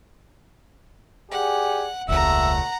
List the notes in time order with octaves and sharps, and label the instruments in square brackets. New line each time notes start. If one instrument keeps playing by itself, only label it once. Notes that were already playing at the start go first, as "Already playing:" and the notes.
[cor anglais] G4 [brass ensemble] G#4 D5 G#5 [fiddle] F#5
[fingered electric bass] E1 C#2 [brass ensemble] A#2 C#3 A3 [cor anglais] E5 [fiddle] F#5 A#5